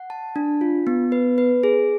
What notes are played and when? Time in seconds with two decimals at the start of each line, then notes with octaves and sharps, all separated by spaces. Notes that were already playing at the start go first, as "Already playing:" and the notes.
Already playing: F#5
0.10 A5
0.36 D4
0.61 F4
0.87 B3
1.12 B4
1.38 B4
1.63 G#4